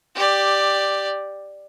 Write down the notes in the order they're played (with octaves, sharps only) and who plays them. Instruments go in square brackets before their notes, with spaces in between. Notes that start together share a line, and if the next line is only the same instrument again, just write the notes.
[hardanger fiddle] G4 D5